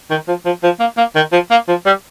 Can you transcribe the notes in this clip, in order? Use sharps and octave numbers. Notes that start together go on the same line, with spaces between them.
D#3
F3
F3
F3
A#3
A#3
D#3
F3
A#3
F3
G3